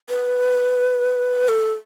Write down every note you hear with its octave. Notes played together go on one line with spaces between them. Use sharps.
B4
A4